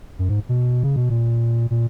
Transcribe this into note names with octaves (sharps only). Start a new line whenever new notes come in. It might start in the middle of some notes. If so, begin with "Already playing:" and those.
F#2
G#2
B2
C#3
B2
A#2
A#2